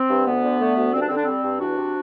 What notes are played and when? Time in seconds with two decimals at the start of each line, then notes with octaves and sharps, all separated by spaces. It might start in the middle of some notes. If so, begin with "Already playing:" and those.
Already playing: C4
0.09 G2
0.27 D2 B3
0.43 D3
0.60 A3
0.77 D2
0.93 G2 C4
1.01 D4
1.08 D3 C4
1.17 D4
1.25 G3 C4
1.43 G2
1.60 E2 D4 F#4
1.77 C3